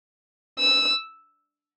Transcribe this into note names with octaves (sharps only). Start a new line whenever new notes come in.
E6